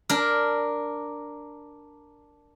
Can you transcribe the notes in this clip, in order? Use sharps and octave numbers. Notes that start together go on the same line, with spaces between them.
D4 A#4